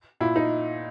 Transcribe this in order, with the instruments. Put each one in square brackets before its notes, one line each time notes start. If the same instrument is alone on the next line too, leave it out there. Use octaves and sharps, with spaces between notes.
[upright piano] A#2 E4
D#4